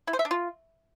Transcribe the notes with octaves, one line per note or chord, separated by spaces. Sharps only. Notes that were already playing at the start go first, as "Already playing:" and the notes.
E4
C5
E5
D4
F4